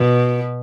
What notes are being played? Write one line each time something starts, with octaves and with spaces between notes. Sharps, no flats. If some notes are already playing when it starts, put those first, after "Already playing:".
Already playing: B2